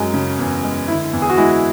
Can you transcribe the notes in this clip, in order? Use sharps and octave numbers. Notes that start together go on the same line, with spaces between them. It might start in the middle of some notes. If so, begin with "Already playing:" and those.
Already playing: F#2 G#3
C#3
E2
G#3
D3 E4
E2
G#4
F#4
G#3 E4